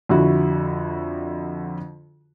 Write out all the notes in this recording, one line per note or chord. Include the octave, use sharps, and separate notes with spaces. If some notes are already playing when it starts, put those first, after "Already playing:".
F2 D3 E4 F#4